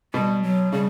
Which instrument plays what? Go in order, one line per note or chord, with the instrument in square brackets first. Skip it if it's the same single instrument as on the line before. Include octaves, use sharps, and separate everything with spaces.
[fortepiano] B2 [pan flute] G3
[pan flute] F#3
[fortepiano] C#3 [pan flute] G3